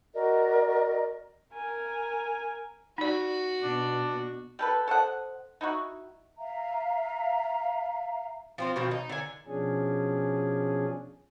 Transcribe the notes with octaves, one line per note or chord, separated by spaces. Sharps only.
F#4 A#4 D5 D#5
A#4 G#5
D#4 F#4 D5
B2 D4
G3 A4 B4
A4 C5 D#5 F#5
D#4 E4 F#4
E5 F5 A#5
F3 C4 F4
B2 D#3 F3 C4
D#4
D3 G#5
B2 F3 C#4 D4 G#4